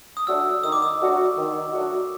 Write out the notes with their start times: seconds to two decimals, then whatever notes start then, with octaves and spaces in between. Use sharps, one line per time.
0.17 D#6
0.27 F#3 A3 D4 F#4 E6
0.63 D#3 D#6
0.72 D6
0.82 D#6
1.01 F#3 A3 D4 F#4
1.37 D#3
1.73 F#3 A3 D4 F#4